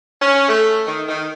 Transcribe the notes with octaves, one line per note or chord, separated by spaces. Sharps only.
C#4
A3
D#3
D#3